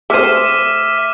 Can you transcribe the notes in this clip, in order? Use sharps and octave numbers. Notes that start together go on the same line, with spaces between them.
A3 C5 E5 D6 F6 D#7